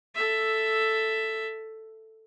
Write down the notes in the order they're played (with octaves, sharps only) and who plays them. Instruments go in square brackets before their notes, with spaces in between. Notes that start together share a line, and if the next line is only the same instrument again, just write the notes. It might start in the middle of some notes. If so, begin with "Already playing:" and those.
[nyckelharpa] A4 E5